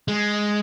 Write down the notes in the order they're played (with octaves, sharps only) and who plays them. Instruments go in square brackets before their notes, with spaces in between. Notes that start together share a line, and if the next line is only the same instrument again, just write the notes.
[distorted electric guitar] G#3